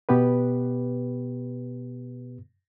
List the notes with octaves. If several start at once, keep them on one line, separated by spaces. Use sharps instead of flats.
B2 B3 G4 B4